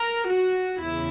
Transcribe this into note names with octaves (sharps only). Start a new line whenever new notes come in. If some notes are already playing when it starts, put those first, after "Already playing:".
Already playing: A#4
F#4
E2 C#3 E4